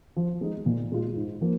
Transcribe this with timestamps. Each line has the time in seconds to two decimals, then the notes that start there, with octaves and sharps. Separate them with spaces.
0.16 F3
0.41 G#3 D#4
0.66 A#2
0.92 G#3 F4
1.16 G#2
1.41 F3 A#3